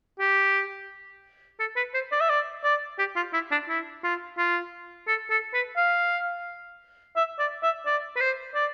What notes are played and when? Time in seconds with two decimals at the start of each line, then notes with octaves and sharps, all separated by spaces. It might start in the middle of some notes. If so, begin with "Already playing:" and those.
0.20 G4
1.60 A4
1.76 B4
1.94 C5
2.12 D5
2.21 E5
2.30 D5
2.64 D5
2.99 G4
3.16 F4
3.33 E4
3.51 D4
3.69 E4
4.04 F4
4.38 F4
5.08 A4
5.30 A4
5.54 B4
5.77 F5
7.16 E5
7.39 D5
7.63 E5
7.86 D5
8.16 B4
8.20 C5
8.55 D5